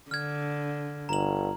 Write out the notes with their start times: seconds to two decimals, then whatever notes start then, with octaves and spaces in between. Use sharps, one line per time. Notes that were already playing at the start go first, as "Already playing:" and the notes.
0.11 D3 F6 G#6
1.09 G1 A#5 F#7